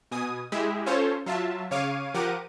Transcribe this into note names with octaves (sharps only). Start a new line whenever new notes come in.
B2 G#5 D#6
G#3 E4 G4 G#4 E5
C#4 F4 A4 C5 C#5
F#3 F4 E5 A5
C#3 C#5 F5 D6 D#7
F3 G4 A#4 F#5 D6 D#7